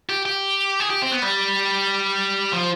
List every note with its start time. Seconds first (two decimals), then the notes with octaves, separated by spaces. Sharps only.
0.09 G4
0.26 G4
0.80 G#4
0.90 G4
1.02 C4
1.12 B3
1.22 G3
2.52 F3